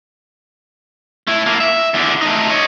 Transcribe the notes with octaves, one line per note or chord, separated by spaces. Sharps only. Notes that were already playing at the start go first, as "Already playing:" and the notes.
A3 E4
A2 A#3
E5
E2 D3
A3 D#4
C#5 D#5